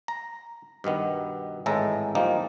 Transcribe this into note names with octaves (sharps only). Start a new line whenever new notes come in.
A#5
G2 B2 D#3 B3
G#1 A2 E3 G#3 A4 A#5
E2 F3 G3 A#3 D#4